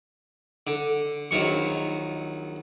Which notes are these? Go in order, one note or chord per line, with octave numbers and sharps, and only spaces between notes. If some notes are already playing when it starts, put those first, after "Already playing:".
D3
A#1 D#3 F#3 C#6